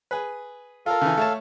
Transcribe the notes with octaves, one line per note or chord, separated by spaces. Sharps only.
G#4 B4
F4 A4 A#4 F5
C#3 E3
A3 C#5 A5